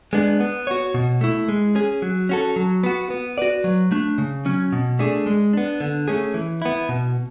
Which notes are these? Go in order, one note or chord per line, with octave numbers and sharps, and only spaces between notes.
G#3 B3 D4
B3
F#4 C#5
B2
A3 E4
G#3
C#4 G#4
F#3
C#4 F#4 A4
F#3
B3 F#4
B3
F#4 B4 D5
F#3
A3 D4
C#3
F#3 C#4
B2
A3 D4 G#4
G#3
B3 D4
D3
A3 C#4 G#4
E3
B3 E4
B2